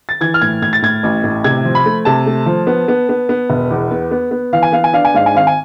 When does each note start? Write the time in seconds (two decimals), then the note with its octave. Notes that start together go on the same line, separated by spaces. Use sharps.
0.09 A6
0.21 E3 G#6
0.34 F6
0.42 A2 G#6
0.62 A2 G#6
0.73 A6
0.82 A2 G#6
1.03 A1
1.24 A2
1.44 C3 G#6
1.65 F3
1.75 B5
1.86 A3
2.05 C3 A5
2.26 A3
2.46 F3
2.67 B3
2.88 B3
3.09 B3
3.29 B3
3.50 E1
3.71 E2
3.91 B3
4.11 B3
4.31 B3
4.53 E3 F5
4.63 G#5
4.72 B3 F5
4.84 G#5
4.93 D4 F5
5.05 G#5
5.14 G#2 F5
5.26 G#5
5.34 G#1 F5
5.47 G#5